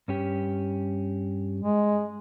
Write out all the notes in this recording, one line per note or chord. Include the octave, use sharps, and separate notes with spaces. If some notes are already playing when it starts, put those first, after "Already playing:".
G2 C#4 G4
G#3